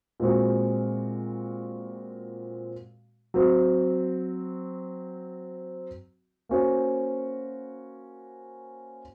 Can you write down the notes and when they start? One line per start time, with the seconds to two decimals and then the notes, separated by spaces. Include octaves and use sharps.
0.20 A#2 G#3 C4 F#4
3.34 F#3 C4 F#4
6.49 A#3 C#4 F#4 C5